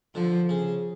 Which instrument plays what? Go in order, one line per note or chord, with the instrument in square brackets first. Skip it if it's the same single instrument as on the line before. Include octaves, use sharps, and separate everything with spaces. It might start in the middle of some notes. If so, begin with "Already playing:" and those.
[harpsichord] D3 [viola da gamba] F3
[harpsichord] C#3